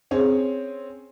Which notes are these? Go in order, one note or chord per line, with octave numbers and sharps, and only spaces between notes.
C4 C#4 G#4